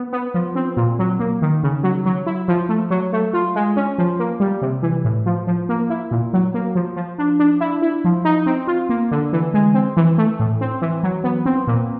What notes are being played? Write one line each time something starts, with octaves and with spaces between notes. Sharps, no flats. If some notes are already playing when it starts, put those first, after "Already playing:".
Already playing: B3
B3
F3
C4
A#2
F#3
A#3
D#3
C#3
F#3
F#3
E4
F3
A3
F#3
A3
F4
G#3
C#4
F3
A#3
G3
C3
E3
A2
F3
F3
A#3
E4
A#2
F#3
A#3
F3
F3
D4
D4
E4
E4
F3
D#4
C4
F4
A#3
D3
E3
G#3
C4
E3
A3
A2
C4
E3
F#3
B3
C4
A#2